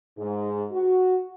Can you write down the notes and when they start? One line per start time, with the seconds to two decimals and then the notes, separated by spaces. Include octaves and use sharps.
0.18 G#2
0.72 F#4